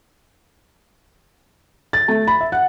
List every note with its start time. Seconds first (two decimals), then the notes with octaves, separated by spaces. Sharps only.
1.93 A6
2.08 A3
2.27 B5
2.41 E5
2.52 F#5